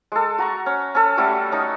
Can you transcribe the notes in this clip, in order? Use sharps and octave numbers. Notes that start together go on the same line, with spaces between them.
G#3 A4
F#4 A#5 C#6
C#4
C#4 A4
G3 A3 C#4 F#4
C#4 D#4 D#6